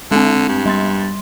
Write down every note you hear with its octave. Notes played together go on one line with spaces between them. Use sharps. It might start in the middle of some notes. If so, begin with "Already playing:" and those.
D3 G#3 C4
G2
G3 C6 A6